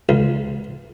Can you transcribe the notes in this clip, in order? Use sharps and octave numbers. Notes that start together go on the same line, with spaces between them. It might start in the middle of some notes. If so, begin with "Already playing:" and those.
C#2